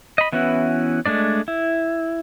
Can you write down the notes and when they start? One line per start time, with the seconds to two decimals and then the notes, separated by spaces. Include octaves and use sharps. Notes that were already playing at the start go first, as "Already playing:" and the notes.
0.18 D#5 B5
0.33 E3 B3 C#4 E4 F#4
1.06 G#3 A3 D4 D5
1.48 E4